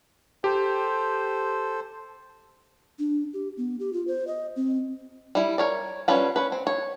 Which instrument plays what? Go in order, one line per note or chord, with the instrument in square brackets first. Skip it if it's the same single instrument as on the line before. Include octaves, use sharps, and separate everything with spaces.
[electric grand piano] G4 [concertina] A4 C5
[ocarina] D4
G4
B3
G4
F4
C5
D#5
C4
[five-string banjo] G3 E4
A#4 C#5 D5
G3 C#4 F4 B4 F#5
C#4 B4
C4
C#5